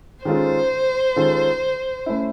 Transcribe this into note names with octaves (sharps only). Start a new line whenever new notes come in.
D#3 G#3 C#4 F4 A4 C5
D#3 G#3 C#4 F4 A4
A3 C#4 E4